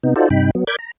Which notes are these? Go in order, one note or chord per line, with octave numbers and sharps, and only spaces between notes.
C3 B3 D#4
D#4 F4 F#4 A4 C5 D5
G2 C3 D#4 G5 B5
F#3 B3
A#4 D5 B5 D6 G6 G#6
A#5